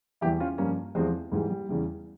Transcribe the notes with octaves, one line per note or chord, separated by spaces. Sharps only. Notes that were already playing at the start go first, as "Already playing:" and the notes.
E2 E3 G3 E4 G4
C#4 F4
G2 F3 A#3 C#4
E2 C3 F3 G#3 C4
G#2 E3 G3 G#3
G3
E2 C#3 E3 G3